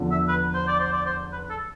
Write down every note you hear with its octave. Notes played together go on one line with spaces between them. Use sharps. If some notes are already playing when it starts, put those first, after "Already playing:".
Already playing: E2 D3 F3
E5
B4
C5
D5
C5
D5
C5
B4
A4